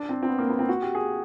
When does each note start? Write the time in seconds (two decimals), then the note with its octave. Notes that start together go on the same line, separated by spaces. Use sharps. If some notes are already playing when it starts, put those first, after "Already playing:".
Already playing: D4
0.09 C4
0.23 C4
0.29 B3
0.38 A#3
0.49 B3
0.59 C4
0.69 F#4
0.82 G4
0.95 G#4